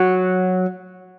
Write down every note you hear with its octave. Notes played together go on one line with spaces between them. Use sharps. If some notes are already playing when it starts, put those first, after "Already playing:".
Already playing: F#3